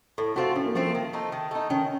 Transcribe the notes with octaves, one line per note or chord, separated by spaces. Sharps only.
A2 A4
A3 C4 F4 F#4
A2 C#4
A#3
F3 A3 C4 F4
A#3
D#3
A3 D#4
D#3
A3 D#4
D#3 C#4